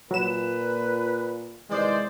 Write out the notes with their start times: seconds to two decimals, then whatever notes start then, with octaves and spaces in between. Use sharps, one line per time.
0.11 A#2 F#3 B4 E7
1.70 C3 D#3 E3 G#3 C5 D5